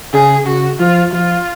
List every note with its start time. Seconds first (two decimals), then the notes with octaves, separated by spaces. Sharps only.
0.13 C#3 G#4
0.46 C#3 F#4
0.80 F3 F4
1.12 F3 F4